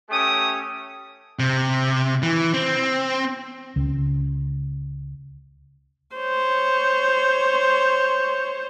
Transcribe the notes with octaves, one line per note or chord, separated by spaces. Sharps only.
A3 C#4 G4 D#6
C3
E3
C4
C#2
C5 C#5